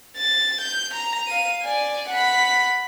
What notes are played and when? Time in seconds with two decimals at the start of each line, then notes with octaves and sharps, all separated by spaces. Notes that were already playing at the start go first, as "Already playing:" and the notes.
0.16 A6
0.60 G6
0.94 A#5
1.27 F5 D#7
1.62 D5 G#5
2.09 F#5 B5